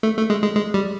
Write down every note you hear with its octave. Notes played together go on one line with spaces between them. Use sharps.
A3
A3
G#3
G#3
G#3
G3